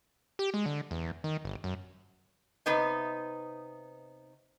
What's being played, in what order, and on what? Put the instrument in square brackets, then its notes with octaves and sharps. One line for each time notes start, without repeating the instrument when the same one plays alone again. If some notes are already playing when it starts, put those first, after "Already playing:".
[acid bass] G4
G#3
D3
E2
D#3
G1
F#2
[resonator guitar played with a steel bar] C3 B3 D#4